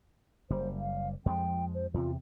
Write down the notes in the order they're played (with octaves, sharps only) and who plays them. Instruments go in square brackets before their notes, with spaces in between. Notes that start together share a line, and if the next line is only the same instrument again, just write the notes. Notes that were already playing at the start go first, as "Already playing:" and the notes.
[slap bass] F#1 G3 [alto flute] C5
[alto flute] F5
[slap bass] F2 F3 G#3 [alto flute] G5
[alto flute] C5
[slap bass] E2 C3 [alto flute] F4